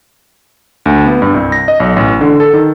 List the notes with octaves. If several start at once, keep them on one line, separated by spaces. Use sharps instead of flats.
D2
B3
G2
C2
A#6
D#5
B1
A1
D3
A4
D#3